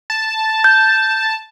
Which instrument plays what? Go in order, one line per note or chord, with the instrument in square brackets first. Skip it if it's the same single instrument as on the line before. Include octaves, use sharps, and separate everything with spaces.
[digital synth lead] A5
[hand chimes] G6